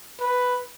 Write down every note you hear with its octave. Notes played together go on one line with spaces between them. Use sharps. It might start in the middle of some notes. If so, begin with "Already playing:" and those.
B4